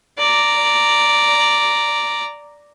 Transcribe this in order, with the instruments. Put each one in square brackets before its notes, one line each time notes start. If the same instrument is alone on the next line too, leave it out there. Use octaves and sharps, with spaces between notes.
[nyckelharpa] D5 A#5